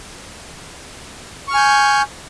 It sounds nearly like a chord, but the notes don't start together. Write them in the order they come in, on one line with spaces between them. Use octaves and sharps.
C#6 F6 G#5 G6